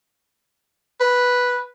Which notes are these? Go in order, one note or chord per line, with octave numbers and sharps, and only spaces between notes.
B4